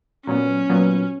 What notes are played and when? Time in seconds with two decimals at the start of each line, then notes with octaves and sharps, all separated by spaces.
0.27 A#2 F#3 B3 C#4
0.69 A#2 F#3 B3